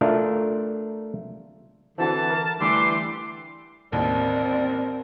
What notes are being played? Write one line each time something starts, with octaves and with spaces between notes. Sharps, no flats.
A3 D4 F4 A#4
D3 E3 C4 F#4 A4 A5
A#4
D3 E3 G3 A3 C6 D6
A1 D#2 C4 A#4 D5